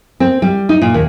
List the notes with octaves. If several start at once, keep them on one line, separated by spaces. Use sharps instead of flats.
C4
G3
D#4
A#2
D#2